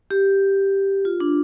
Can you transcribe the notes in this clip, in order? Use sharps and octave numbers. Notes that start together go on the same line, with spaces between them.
G4
F4
D4